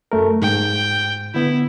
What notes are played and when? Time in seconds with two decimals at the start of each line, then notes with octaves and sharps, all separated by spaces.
0.12 F#2 A3 A#4
0.42 G#2 G5
1.34 D3 B3 E4